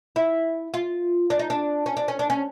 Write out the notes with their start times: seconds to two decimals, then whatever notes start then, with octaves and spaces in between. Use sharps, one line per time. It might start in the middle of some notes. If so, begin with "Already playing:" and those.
0.16 E4
0.74 F4
1.30 D4
1.39 D#4
1.50 D4
1.86 C#4
1.97 D4
2.08 C#4
2.19 D4
2.30 C#4